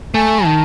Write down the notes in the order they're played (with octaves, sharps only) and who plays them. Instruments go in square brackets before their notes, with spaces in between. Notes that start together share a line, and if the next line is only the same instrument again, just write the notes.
[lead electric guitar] A3 [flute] G#5
[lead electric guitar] D#3 [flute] A5